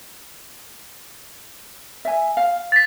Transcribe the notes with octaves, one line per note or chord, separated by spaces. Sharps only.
E5 G#5
F5
A6 B6